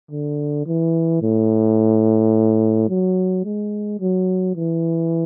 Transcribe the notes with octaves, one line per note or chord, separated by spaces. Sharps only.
D3
E3
A2
F#3
G#3
F#3
E3